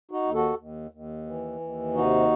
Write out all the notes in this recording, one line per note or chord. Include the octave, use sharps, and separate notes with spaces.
D#4 F#4
D#2
F#4 A4
D#2
D#2
E3
D#2
C3 D#4 F#4